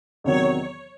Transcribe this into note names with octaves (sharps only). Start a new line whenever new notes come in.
E2 C3 D#3 F#3 C#5